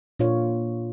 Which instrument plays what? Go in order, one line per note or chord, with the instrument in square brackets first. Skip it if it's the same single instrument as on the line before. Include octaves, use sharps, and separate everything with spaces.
[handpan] A#2 D4 F4 C#5